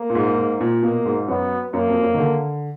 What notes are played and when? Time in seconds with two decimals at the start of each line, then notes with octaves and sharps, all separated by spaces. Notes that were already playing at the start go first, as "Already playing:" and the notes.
Already playing: A#3
0.10 A#2
0.15 G#2
0.38 G#2
0.61 A#2
0.83 B2 A#3
1.05 G#2
1.28 F#2 B3
1.73 F#2 A#3
1.88 F2
2.01 F#2
2.15 D#3
2.19 D3